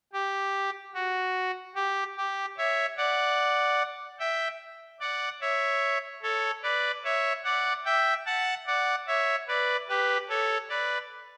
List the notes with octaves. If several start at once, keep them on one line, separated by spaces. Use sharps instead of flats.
G4
F#4
G4
G4
C#5 E5
D5 F#5
E5 G5
D5 F#5
C#5 E5
A4 C#5
B4 D5
C#5 E5
D5 F#5
E5 G5
F#5 A5
D5 F#5
C#5 E5
B4 D5
G4 B4
A4 C#5
B4 D5